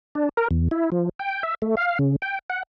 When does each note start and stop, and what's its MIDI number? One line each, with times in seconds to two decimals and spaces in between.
0.15 0.29 62
0.37 0.48 70
0.51 0.68 40
0.71 0.90 64
0.92 1.09 53
1.19 1.43 79
1.43 1.55 76
1.62 1.75 57
1.77 1.99 77
1.99 2.16 49
2.22 2.39 79
2.50 2.63 78